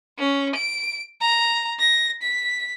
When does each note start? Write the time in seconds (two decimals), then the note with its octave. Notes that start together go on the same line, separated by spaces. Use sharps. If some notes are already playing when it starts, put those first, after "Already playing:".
0.19 C#4
0.55 D7
1.21 A#5
1.79 A#6
2.22 B6